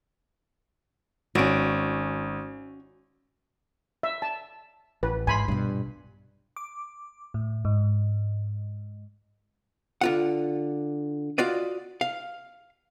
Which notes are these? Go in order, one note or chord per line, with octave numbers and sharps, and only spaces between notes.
G#1 C#4 F#4 D7
E5
A5
A1 B4
G#2 G#5 B5 C6
A#1 G2 B2
D6
A2
G#2
D3 F4 F#5
F4 F#4 D5 D#5
F5